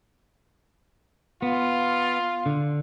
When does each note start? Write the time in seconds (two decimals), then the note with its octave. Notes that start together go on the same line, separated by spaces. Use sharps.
1.42 B3 F4
2.46 D3